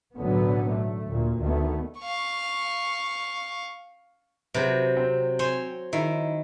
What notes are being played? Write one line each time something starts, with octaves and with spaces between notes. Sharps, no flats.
B1 A2 D3 F#3 B3
A3
D2 A#2
D2 D#3 A3 B3
F5 C#6
C3 F#3 B4 C5
C4
C5 C#5 G#5
D#3 E4